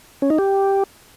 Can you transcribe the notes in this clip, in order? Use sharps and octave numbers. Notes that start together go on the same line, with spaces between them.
C#4
D#4
G4